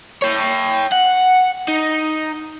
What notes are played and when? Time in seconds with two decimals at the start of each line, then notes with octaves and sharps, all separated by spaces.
0.22 C#5 G5
0.92 F#5
1.68 D#4